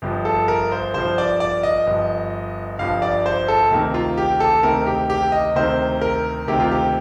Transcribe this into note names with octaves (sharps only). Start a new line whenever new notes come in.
G1 G2 F3
A4
A#4
C5
G1 G2 F3 C5
D5
D5
D#5
G1 G2 F3
G1 G2 F3 F5
D5
C5
A4
D2 C3 D#3 A#3
F4
G4
A4
D2 C3 D#3 A#3 A#4
G4
G4
D#5
D2 C3 D#3 A#3 C5
A#4
D2 C3 D#3 A#3 G4
F4
G4